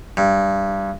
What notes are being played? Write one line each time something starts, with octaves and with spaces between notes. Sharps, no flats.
G2